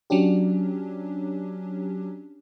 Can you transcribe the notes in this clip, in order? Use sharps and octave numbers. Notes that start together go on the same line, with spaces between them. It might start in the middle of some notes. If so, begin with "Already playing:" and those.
F#3 C#4 D4 G4